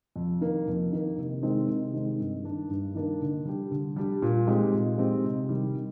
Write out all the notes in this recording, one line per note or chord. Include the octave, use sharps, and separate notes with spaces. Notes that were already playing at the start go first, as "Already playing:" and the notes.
F2
D#3 A#3
F2
D#3 A#3
C3
D#3 G#3 C4 D#4
C3
D#3 G#3 C4 D#4
G2
D#3 A#3 D4
G2
D#3 A#3 D4
D3
G3 D4 G4
D3
G3 D4 G4
A#2
G#3 C4 D#4 G4
A#2
G#3 C4 D#4 G4
C3
D#3 G3
C3